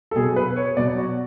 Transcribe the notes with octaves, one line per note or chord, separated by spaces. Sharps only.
A4
B2 F#3 G#4
B4
C#5
B2 F#3 D5
F#4